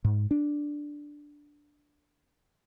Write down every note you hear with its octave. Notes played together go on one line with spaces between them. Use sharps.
G#2
D4